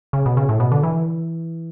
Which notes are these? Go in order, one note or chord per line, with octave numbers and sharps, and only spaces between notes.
C#3
B2
C#3
A2
B2
D3
E3